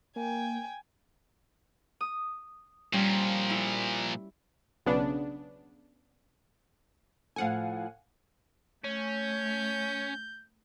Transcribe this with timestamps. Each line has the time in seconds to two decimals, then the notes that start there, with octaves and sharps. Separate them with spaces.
0.16 A#3 G5 G#5
2.01 D#6
2.93 A#2 F3 G3 C#4
3.50 E4
4.86 B1 C#3 B3 D4
7.36 A2 F3 A4 F5 F#5 G#5
8.84 A3 C#4 G6